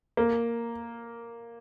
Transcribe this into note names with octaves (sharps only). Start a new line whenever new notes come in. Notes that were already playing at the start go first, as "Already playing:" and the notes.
A#3